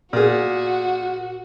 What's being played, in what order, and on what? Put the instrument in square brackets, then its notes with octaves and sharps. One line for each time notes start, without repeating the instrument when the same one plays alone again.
[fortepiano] A#2 G#4 [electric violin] F#4